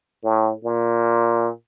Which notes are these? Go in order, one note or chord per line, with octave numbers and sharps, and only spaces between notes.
A2
A#2